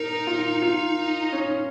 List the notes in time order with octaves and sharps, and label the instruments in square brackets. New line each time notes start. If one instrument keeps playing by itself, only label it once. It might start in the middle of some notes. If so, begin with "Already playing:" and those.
Already playing: [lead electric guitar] D#4 [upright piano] A#4
[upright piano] F4
F4
C#4